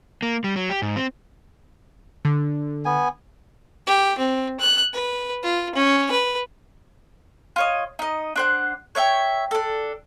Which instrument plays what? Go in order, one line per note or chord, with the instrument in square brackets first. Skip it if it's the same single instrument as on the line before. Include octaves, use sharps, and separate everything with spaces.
[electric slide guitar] A#3
G3
F#3
G4
G#2
C4
[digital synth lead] D3
[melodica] B3 G#5
[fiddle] G4
C4
F#6
B4
F4
C#4
B4
[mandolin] F4 C#5 D#5
D#4 D#5
D4 C5 F#5
C#5 D5 E5 G5
D4 A4